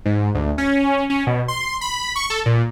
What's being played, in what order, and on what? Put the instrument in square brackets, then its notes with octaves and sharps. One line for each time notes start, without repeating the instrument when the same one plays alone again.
[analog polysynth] G#2
D2
C#4
C#4
B2
C6
B5
C#6
A4
A#2